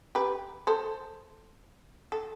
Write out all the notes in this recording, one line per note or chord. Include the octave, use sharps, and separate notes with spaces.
G4 B4
A4 C5
A4